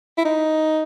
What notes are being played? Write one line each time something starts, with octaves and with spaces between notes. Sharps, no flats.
E4
D#4